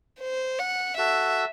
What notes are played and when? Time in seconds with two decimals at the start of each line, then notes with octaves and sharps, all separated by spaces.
0.20 C5
0.59 F#5
0.98 F#4 A4 E5